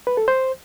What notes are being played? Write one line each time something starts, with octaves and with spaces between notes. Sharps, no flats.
B4
A4
C5